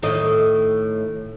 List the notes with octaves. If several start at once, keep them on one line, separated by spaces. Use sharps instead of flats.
A2 D#3 D#5